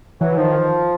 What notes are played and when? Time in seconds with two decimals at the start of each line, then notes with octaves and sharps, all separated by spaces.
0.21 E3 F#3
0.37 D#3 F3